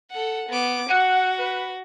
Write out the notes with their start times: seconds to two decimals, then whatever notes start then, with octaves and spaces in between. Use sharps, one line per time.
0.10 A4 F#5
0.49 B3 D6
0.90 F#4 F#5
1.38 B4